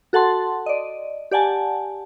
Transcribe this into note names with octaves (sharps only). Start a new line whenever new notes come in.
F#4 A4 F#5 A5 C6
D5 D#5
G4 D5 F#5 G#5 A5